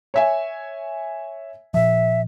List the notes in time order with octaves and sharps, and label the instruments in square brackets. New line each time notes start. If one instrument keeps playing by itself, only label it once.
[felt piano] C#5 E5 G#5
[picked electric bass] A#2 F3 [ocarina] E5